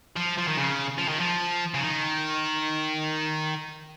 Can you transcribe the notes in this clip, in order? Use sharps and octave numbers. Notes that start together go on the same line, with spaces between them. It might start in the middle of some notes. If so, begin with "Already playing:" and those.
F3
F3
D#3
C#3
F3
D#3
F3
C#3
D#3